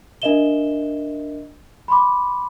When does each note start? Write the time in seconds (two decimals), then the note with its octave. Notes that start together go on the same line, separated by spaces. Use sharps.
0.22 D4 A#4 D#5 E5 E7 G7
1.88 B5 C6 D6